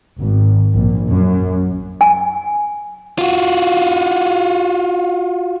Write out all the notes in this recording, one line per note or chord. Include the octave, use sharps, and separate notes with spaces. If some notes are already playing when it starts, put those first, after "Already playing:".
G#1
A#1
F#2
G#5
F4 F#4